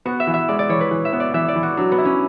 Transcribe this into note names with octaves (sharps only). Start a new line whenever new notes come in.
B3 F#4
E5
E3
E5
G#3 D5
D5
E3 C#5
B4
E3
E5
B3
D5
E3 E5
D5
E3
F#4
F#3 D4
B3
E4
C#4